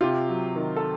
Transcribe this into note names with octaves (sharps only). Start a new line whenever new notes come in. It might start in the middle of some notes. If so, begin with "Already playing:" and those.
C3 F4 G4
F#3
D#3
A4